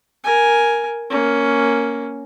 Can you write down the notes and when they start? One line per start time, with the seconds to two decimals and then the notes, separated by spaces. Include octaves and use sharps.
0.24 A#4 G#5
1.11 A#3 C#4